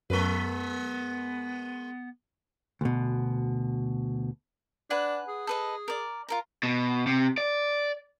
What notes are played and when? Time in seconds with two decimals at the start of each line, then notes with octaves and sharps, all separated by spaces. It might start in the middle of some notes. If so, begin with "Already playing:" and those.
0.10 F#2 G#3 B3 A#4 B4
2.81 D2 B2
4.90 D4 B4 F#5 G#5
5.28 G#4
5.47 A4 B4 D#5
5.88 A#4 D5
6.28 F4 A#4 A#5
6.63 B2
7.07 C3
7.38 D5